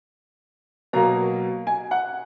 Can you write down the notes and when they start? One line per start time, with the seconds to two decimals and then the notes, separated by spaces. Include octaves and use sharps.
0.93 B2 F#3 A#3 A#5
1.67 G#5
1.91 F#5